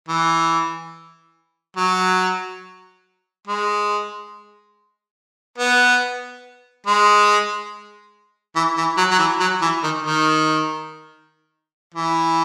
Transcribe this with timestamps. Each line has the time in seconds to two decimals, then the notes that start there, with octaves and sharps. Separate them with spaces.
0.08 E3
1.77 F#3
3.47 G#3
5.58 B3
6.87 G#3
8.56 E3
8.77 E3
8.97 F#3
9.11 F#3
9.19 E3
9.40 F#3
9.62 E3
9.83 D#3
10.04 D#3
11.94 E3